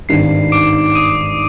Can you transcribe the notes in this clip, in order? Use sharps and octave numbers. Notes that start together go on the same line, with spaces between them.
G#1 G2 D#3 C7
D6 D7
D#6 D#7